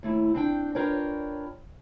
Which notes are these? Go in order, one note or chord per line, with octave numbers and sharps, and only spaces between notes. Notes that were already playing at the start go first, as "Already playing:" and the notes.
D#2 A3 E4
C4 D4 G5
D4 F4 A#4 B4 C#5 G5